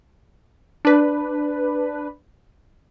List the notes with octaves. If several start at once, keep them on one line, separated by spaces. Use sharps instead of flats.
D4 B4